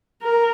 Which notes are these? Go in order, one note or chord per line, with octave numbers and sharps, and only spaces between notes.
A#4